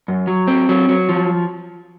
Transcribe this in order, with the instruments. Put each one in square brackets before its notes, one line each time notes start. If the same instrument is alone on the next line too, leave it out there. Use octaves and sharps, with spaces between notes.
[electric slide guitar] F#2
F#3
C4
F#3
F#3
F3